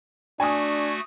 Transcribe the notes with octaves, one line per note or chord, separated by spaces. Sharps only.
A3 D4 F#4 G#5 D#6